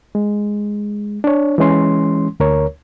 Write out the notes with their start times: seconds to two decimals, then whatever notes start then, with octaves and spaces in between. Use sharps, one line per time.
0.15 G#3
1.24 D4 C#5
1.58 E3 G#3 C#4 C6
2.40 D2 A#4 C#5